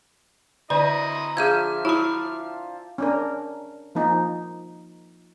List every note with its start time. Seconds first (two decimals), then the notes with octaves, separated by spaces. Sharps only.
0.70 D3 E4 C5 D5 D#5 G#5 A#5
1.37 F3 D4 G#4 E5 F6 G6 G#6
1.85 E4 F#4 B5 D#6
2.98 C#4 D4 A#4
3.95 F3 A#3 D#4